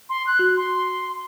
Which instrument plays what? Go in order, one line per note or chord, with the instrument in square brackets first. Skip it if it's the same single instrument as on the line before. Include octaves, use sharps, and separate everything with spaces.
[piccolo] C6
F#6
[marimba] F#4
[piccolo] C6